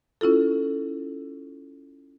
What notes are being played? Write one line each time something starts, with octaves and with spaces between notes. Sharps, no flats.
C#4 E4 F4 A4